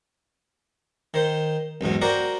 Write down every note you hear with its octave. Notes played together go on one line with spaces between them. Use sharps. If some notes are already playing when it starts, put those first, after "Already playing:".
D#3 C5
B1 E2 G#2 B2
F#4 A#4 C5 D5 F#5 G5